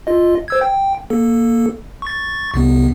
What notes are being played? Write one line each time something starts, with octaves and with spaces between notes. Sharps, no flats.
F4 D#5
C5 E6 G#6
G5
A#3 A4
C#6 A6
C2 C3 B3